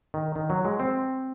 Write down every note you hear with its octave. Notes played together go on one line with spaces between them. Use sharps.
D#3
D#3
F#3
G#3
C4